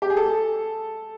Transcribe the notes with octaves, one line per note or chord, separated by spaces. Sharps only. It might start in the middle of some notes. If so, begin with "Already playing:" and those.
G4
G#4
A4